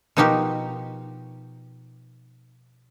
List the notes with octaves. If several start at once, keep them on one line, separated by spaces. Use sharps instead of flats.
B2 F3 D#4 F#4 G4 A#4